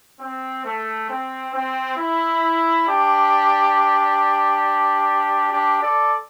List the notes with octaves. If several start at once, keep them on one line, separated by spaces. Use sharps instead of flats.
C4
A3
C4
C4
E4
D4 G4
D4 G4
A4 D5